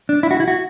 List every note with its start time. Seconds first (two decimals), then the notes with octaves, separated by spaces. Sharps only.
0.09 D4
0.23 E4
0.31 F#4
0.40 E4
0.48 F#4